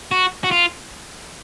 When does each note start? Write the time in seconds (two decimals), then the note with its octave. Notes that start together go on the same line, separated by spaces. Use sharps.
0.11 F#4
0.44 F#4
0.51 F4